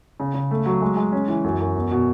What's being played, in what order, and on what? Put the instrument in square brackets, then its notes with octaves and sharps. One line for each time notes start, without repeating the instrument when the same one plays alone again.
[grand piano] C#3
C#3
A3
F#3
G#3
G#3
C#4
E3
F#2
F#2
E2
B2